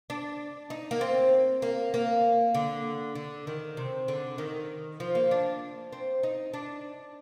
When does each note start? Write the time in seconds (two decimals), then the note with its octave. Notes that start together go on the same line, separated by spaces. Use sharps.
0.10 D4
0.70 D#4
0.91 A#3
1.01 C4
1.62 A#3
1.94 A#3
2.55 D3
3.15 D3
3.47 D#3
3.77 C3
4.08 D3
4.38 D#3
5.00 F3
5.15 A#3
5.31 D4
5.92 C4
6.23 D#4
6.54 D4